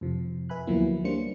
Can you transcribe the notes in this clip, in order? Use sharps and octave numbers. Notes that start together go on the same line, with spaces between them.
F2 C3 F3
B4 E5 G#5 B5 F#6
D2 F3 F#3 A#3 B3 E4
G3 A#3 C#4 D4 C5 C#7